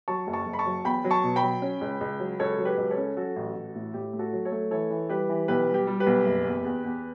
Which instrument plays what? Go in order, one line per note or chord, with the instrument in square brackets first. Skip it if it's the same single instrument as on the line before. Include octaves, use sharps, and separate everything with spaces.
[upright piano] F#3 A5 C#6
F#1
A5 C#6
F#1
B5
A5 C#6
F#3
E2 G5 B5
F#3
A5 C#6
B2
G5 B5
F#3
C#4
C#2
C#2
F#3
C#2 A4 C#5
F#3
G4 B4
C#2
A4 C#5
C#4
F#3 F#4 A4
A1
A1
A2
A2 G4
A3
F#4 A4
F#3
A4 C#5
A3
E3 A4 C#5
E3
G3 G4 B4
E3
B1 G4 B4
G3
G4
G3
G4 B4
B1
F#1
E2
E2
E2